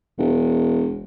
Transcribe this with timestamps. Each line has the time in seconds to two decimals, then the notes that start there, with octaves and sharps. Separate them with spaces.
0.18 E1